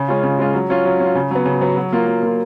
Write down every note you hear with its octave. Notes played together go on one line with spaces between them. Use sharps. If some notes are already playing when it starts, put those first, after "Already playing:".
Already playing: C#3
G#3 C#4 F4
C#3
G#3 C#4 F4
F#3
C#4 F4
F#3
C#4 F4
C#3
F#3 B3
C#3
F#3 B3
F#3
A#3 F4
F#3
A#3 F4